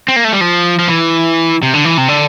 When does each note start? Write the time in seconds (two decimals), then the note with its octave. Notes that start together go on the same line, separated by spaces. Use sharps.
0.08 C4
0.16 A#3
0.24 A3
0.33 G3
0.41 F3
0.79 F3
0.88 E3
1.63 C3
1.74 D3
1.85 E3
1.97 C3
2.08 D3